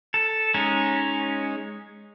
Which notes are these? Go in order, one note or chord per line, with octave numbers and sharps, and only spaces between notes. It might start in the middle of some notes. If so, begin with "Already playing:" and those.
A4
G#3 C#4 D#4